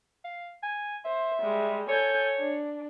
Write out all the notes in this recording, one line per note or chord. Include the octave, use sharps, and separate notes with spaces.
F5
G#5
C5 E5
G3 G#3
A4 C#5 G#5 G6
D4